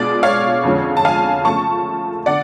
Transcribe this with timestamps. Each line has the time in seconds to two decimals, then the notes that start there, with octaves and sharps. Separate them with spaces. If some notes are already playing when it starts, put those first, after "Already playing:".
Already playing: B2 G#3 B3 D4 F4 D5
0.23 C#5 F5
0.63 F2 D3 F3 G#3 C#4
0.97 A5
1.05 F5 G#5
1.45 C#3 F3 A3 F4 A5 C#6
2.26 D3 D5 F#5